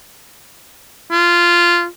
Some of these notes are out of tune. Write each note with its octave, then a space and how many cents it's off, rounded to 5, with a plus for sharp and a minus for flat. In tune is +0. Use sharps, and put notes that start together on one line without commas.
F4 -10